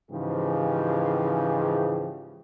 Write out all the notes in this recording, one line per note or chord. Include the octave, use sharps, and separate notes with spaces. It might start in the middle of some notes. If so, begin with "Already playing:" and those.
G#2 C#3 E3 F3 G4 G#4